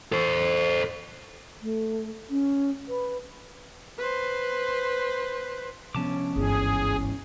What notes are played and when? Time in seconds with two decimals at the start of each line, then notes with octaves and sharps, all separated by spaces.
0.12 A4 C5
1.62 A3
2.30 C#4
2.88 B4
3.98 B4 C5
5.95 C3 F3 B3 C#4 A5 D6
6.36 G1 C2 G#2 E3 G#4